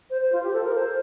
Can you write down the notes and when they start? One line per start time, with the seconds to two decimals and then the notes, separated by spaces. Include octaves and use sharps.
0.10 C5
0.22 C5
0.33 F4
0.43 G4
0.53 A4
0.64 A#4
0.75 C5